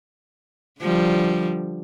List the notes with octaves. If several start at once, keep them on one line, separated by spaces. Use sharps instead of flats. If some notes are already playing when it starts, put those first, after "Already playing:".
D3 F3 G3